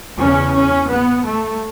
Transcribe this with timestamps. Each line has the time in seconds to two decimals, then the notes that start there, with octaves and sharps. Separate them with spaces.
0.19 E2 C#3 C#4
0.54 C#4
0.89 B3
1.24 A3